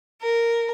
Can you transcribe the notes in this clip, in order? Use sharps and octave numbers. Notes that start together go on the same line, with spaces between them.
A#4